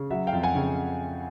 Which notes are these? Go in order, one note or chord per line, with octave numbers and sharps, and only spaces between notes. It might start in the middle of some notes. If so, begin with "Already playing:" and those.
Already playing: C#3
F#3 E5 F#5
F5 G5
F2
F#5 G#5
C#3